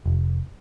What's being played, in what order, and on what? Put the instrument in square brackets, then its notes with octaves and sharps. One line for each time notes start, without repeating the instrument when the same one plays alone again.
[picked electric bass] F1